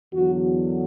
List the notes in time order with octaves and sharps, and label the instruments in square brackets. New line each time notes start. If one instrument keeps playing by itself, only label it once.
[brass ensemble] E2 D3 F#3 F#4